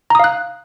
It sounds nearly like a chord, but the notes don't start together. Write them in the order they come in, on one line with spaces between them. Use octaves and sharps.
A#5 D#6 F5 F#6